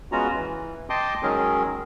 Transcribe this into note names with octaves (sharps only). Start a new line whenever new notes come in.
G#3 B3 C#4 F4 F#4 A#5
E3
D#5 G5 A5 C6 D6 D#6
D#3 F#3 G#3 C#4 G#4 A#4